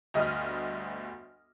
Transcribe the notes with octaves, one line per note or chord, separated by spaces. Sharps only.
G1 D2 D#5 E5 D#6 F6